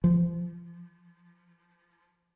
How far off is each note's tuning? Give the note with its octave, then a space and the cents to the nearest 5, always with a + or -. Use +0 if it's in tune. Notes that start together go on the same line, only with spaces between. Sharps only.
F3 -25